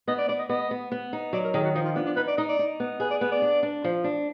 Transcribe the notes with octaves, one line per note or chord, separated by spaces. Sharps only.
B3 D#5
D5
B3 D5
D#5
B3 D#5
B3
B3
D#4
F#3 D5
A#4
D#3 G#4
F#4
F3 D#4
F4
B3 D4
D4
D#4 B4
D5
D#4 D#5
D5
D#4
B3
G#4 B4
D5
B3 B4
D5
D4
D4
F3
D4